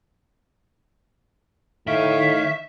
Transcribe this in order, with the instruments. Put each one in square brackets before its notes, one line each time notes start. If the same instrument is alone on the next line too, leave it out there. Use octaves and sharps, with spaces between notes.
[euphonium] A2 [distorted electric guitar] D#3 G5 [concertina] C#5 F5 [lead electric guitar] E5